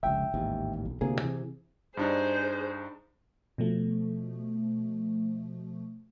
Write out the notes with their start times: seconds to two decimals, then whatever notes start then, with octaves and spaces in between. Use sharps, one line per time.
0.03 F1 C#2 E5 G5
0.34 A1 D#2 G#2
0.85 B1
1.01 D2 C3 A#3 G#4
1.22 C3 E3
1.97 G2 D4 D#4 G#4 C5
3.58 B2 F3 A3